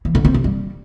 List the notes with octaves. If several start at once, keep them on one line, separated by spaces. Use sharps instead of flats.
E3
D3
C4
C3
G3